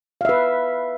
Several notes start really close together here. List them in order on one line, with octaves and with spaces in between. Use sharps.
F5 E5 B4